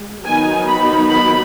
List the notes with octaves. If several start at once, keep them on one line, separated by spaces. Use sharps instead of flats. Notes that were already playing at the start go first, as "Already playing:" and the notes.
Already playing: G#3
D#3 F#3 B3 D#4 G#5
B5
B5